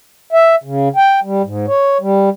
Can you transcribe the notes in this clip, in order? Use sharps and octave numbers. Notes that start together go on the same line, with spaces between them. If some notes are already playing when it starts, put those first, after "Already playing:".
E5
C#3
G5
G3
G#2
C#5
G3